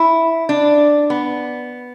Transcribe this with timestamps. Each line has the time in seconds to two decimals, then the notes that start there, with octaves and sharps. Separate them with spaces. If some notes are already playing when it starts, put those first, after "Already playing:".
Already playing: E4
0.49 D4
1.10 B3